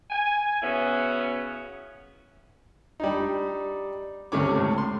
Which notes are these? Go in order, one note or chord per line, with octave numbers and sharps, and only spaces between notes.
G#5
C#3 B3 C#4 E4 F#4
G3 D4 D#4
C#2 C3 A3 C#4 C#5 D6
C#2 A2
C6